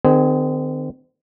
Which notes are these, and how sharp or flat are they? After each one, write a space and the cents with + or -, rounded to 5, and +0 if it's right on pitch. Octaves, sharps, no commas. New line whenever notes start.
D#3 -45 C4 -30 G#4 +0